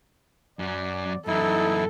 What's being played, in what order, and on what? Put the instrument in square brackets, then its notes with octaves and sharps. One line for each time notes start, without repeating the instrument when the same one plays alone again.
[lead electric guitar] F#2 F#3 [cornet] D5
[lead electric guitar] F#2 E3 [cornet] D#4 [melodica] E4 [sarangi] A4